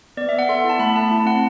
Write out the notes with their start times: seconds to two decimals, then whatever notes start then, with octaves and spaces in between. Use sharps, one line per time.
0.17 B3 D5
0.29 B3 E5
0.39 F#5
0.49 A4 C6
0.64 E4
0.70 A5
0.79 A3 B5
0.96 A3 A5
1.11 E4
1.26 C4 F#5